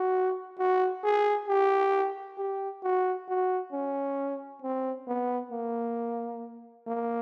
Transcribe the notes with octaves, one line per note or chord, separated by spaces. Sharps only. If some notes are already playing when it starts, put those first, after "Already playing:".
Already playing: F#4
F#4
G#4
G4
G4
F#4
F#4
C#4
C4
B3
A#3
A#3